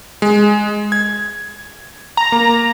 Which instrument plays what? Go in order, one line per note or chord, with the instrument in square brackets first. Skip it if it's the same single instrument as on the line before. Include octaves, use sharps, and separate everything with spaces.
[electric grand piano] G#3
G#6
[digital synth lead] A#5
[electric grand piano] A#3